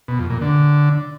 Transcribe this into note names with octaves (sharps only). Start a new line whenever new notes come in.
B2
F2
A#2
D3